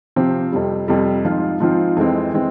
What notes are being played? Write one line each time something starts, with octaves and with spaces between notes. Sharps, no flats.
C3 F3 C4 G4 C5
F2 C3 G3
F2 C3 G3
G#2 F3 C4 F4
G#2 F3 C4 F4
F2 E3 G#3 C4
E3 G#3 C4